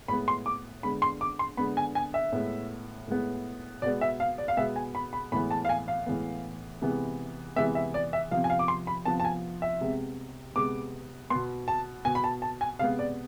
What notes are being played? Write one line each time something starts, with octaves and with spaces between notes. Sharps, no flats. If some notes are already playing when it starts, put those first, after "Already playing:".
A2 G#3 B3 B5
C6
D6
D3 G#3 B3 B5
C6
D6
C6
D3 G#3 B3 B5
G#5
G#5
E5
A2 G#3 B3
A2 G#3 B3
B2 G#3 B3 D5
E5
F5
D5
F5
B2 G#3 B3 E5
G#5
B5
B5
A2 E3 G#3 B3 B5
A5
F5
G#5
F5
A2 E3 G#3 B3
C3 E3 G#3 B3
C3 E3 G#3 B3 E5
E5
D5
E5
C3 F3 B3 F5
G#5
F5
D6
C6
B5
C3 F3 B3 A5
A5
G#5
E5
C3 G#3 B3
C3 G#3 B3 D6
B2 B3 C6
A5
B2 B3 G#5
B5
A5
A5
G#5
C3 G#3 B3 F5
D5